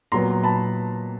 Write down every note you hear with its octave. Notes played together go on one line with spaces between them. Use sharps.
A#2 F#3 B3 A#5 C6
A5 B5